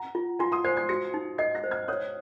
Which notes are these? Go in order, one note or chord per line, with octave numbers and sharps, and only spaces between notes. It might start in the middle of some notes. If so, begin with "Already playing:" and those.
Already playing: F#5 A#5
F4
F4 G#5 C6
C6 D#6
C5 G#6 C7
G#6 C7
F#4 A#6 C#7
D#4
D#5 G#6 C7
F#6 A#6
C5
F6 G#6
C#5 D#6 F#6